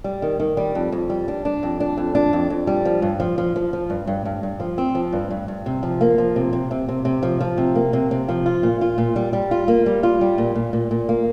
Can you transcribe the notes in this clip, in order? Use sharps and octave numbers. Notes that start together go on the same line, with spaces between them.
G3
D#3
D#3
G3
F2
F2
G3
D4
D4
F2
D4
F2
D4
F2
F2
G3
F3
G2
F3
F3
F3
F3
G2
G2
G2
G2
F3
C4
F3
G2
G2
G2
C3
F3
A#3
F3
C3
C3
C3
C3
C3
F3
F3
C3
A#3
C3
C3
F3
F4
A#2
F4
A#2
G3
G3
F4
A#3
G3
F4
G3
A#2
A#2
A#2
A#2
A#3